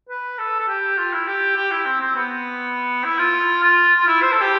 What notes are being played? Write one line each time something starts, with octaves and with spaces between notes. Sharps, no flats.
B4
A4
A4
G4
F4
E4
G4
G4
E4
C4
C4
B3
E4
F4
F4
F4
E4
C5
A4
G4